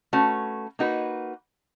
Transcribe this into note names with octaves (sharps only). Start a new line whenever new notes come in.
A3 C#4 F#4 B4
A#3 D#4 F#4 B4